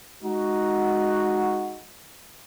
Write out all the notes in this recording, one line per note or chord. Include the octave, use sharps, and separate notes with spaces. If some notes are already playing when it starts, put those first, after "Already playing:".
G#3 D#4 F#4